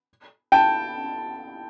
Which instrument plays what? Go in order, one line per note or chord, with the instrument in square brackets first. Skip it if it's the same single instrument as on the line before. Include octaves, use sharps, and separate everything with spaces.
[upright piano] G5 A5